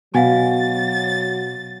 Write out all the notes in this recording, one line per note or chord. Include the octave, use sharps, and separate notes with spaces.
B2 F#3 F5 F#5 G#5 A6